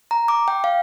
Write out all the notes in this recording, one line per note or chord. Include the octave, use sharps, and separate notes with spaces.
A#5
D6
G5
F5